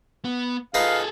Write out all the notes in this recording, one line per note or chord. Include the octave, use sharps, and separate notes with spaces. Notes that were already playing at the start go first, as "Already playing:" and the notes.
B3
D#4 F4 G#4 A4 B4 F5